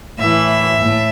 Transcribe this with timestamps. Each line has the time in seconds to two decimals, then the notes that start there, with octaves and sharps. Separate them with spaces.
0.18 A2 E3 E5
0.80 A2